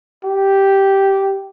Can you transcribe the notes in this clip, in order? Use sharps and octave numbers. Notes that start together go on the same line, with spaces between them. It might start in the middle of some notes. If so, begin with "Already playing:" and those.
G4